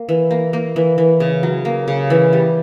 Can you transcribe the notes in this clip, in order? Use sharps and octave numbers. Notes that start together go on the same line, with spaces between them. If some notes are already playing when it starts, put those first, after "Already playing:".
Already playing: A#3
E3
A#3
A#3
E3
E3
C#3
F#3
A#3
C#3
E3
G3